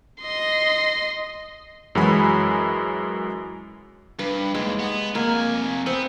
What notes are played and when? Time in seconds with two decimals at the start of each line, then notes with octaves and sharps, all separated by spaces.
0.21 D#5 C6
1.95 F#2 E3 G#3 F#4 G#5 B5
4.19 G2 B4
4.55 D#2 G#3
4.80 B3
5.15 F2 A#3 G#5
5.86 B3 C4